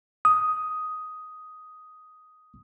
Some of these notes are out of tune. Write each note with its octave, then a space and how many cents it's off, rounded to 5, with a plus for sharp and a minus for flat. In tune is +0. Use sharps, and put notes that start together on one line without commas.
D#6 +5